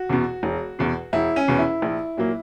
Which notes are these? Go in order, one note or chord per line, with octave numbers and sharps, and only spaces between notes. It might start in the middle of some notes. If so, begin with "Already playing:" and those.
Already playing: F#4
E2 B2
E1
E2 B2
E1 E4
C#4
E2 B2
E4
A#1
A#2 F#3 A#3